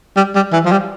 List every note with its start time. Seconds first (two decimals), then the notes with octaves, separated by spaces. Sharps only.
0.16 G3
0.35 G3
0.53 E3
0.65 F3
0.71 G3